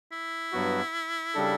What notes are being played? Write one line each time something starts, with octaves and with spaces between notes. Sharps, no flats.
E4
G2 F#3 B3 F#4
C#3 G3 D4 A4